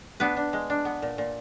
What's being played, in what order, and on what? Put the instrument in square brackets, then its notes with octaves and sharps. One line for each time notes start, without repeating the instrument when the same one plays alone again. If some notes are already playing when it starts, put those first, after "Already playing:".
[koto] B3 D4 B4
D4
G#3
D4
B3
A#2
A#2